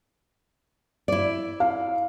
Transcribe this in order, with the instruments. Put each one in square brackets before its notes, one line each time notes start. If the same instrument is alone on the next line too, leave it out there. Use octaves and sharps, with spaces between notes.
[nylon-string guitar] E4 D5
[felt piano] F5